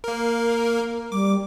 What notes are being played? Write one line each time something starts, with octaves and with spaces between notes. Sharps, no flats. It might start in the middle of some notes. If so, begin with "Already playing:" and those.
A#3 A#4
G3 D6